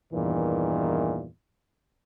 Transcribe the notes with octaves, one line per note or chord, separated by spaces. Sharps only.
E2 G2 A#2 D#3 E3